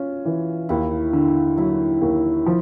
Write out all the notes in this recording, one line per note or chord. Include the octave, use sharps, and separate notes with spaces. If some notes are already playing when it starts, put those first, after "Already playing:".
Already playing: C#4 F4
E3
D#2 E4
D3
F#3 E4
D#2
F3